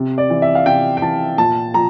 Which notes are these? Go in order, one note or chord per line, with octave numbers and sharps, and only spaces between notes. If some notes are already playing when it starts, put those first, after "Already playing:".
Already playing: C3
D5
E3
E5
F5
C3 G5
G5
E3 A5
A#2 A5
F3 A#5